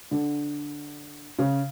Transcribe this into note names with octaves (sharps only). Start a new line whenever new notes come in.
D3
C#3